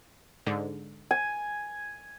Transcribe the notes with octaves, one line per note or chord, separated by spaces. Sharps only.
G#2 D3
G#5